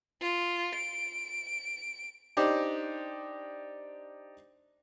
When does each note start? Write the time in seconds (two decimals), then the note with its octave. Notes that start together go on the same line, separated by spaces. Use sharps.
0.21 F4
0.75 D7
2.37 D4 D#4 G4 C5 D5